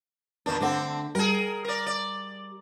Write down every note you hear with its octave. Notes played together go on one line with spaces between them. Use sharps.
E2 A#2 D#3 D4
D3 A3 C4 D4 F#5
G3 G#4 A#4
A#4 D5
D5